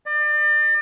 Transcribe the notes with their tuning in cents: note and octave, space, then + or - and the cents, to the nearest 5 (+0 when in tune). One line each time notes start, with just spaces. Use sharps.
D5 +35